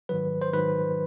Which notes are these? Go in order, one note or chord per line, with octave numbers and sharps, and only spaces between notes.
G#2 D#3 F#3 B4
C5
G#2 D#3 F#3 B4